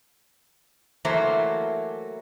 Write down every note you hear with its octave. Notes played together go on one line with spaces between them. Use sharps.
E3 F#3 A3 A#3 C5